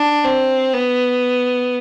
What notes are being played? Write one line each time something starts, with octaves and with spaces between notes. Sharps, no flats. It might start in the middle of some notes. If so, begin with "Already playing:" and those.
Already playing: D4
C4
B3